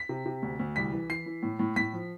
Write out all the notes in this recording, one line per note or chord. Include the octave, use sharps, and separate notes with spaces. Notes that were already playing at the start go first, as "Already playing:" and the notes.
Already playing: B6
C3
C3
D2
D2
C2 B6
E3
E3 C7
E3
A2
A2
A2 B6
F3